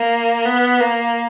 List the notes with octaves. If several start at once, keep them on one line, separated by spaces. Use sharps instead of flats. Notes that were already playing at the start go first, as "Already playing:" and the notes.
Already playing: A#3
B3
A#3